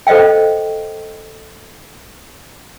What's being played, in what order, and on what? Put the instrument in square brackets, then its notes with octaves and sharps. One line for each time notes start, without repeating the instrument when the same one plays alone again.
[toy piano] A4 C5 D#5 F5 G5